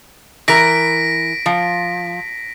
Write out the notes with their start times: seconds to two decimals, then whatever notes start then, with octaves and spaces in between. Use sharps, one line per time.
0.48 E3 A#4 A#6 B6 D7
1.46 F3